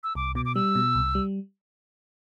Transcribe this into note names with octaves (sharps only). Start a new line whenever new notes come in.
E6
C2 D6
B2 D6
D6
G3 E6
B2
C2
G3